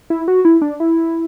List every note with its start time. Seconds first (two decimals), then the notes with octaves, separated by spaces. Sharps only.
0.10 E4
0.28 F#4
0.45 E4
0.62 D4
0.80 E4